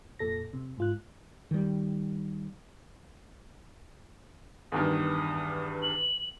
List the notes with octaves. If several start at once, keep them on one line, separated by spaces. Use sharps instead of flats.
F2 A#2 A4 A#6
C3
G#2 F4 F#6
D#3 G3
E2 G2 D#3 D#6
F#7